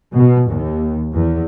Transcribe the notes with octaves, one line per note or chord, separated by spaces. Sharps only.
B2
D#2
E2